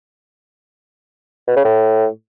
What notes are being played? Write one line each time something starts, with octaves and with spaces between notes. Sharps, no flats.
B2
C#3
A2